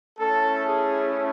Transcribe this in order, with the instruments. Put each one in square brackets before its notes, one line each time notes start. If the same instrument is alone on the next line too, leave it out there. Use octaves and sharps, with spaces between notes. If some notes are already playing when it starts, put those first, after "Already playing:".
[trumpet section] A3 C#4 E4 A4
G#4